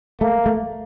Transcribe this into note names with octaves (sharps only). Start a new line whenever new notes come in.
A3 A#3
A3